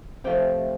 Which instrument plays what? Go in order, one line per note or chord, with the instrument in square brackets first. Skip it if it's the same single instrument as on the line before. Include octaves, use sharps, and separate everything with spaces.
[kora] C3 F3 A3 G5